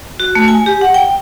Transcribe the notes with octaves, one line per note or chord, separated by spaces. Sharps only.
F#4
A3
G#5
G4
F#5
G5